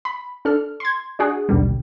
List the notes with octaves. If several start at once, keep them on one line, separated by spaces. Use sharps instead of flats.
B5
D4 A4 F6
C6 G#6
D4 F#4 G#4 F#5
A#1 D#2 B2 D3 G3